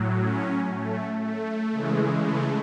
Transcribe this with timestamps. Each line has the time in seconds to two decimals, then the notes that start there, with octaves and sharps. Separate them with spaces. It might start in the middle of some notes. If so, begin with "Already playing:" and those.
Already playing: A2 F#3
0.20 C#4
0.71 A3
1.21 A3
1.71 C#3 E3 G#3
2.21 A3